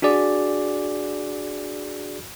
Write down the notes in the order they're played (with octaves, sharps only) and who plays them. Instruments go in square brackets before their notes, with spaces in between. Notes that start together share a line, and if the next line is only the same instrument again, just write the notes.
[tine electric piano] D4 F#4 G#4 D5